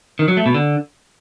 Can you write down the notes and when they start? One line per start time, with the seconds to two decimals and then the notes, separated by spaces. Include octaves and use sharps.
0.19 D#3
0.28 F#3
0.37 A3
0.46 B2
0.55 D3